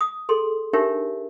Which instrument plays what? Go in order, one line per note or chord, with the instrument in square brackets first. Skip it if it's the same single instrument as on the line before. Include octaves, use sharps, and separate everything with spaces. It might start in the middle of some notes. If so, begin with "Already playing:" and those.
[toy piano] D#6
G#4 A4 C6
D4 D#4 G4 A#4 C#5 E5